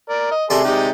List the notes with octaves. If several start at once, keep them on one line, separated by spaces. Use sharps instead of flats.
A#4 D5
D#5
C3 G#4 A4 D5 C6
G#3 D#4 G4